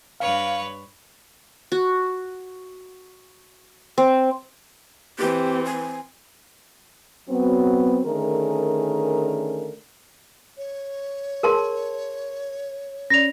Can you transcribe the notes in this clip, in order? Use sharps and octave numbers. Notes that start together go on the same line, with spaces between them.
G2 B4 C#5 F5
F#4
C4
E3 C4 G4
G#5
F#3 B3 C4
D3 D#3 A3 C#4 G#4 A#4
C#5
G#4 A#4 A5 C6
C#4 D5 A#6 F7